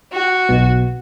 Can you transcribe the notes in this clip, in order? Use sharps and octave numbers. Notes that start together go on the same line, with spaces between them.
F#4
B1 B2